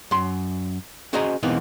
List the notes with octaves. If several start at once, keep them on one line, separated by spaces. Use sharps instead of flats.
F#2 C6
C#4 F#4 G#4 C5 D#5 A#5
E2 B2 E3 A#3 C4 D#4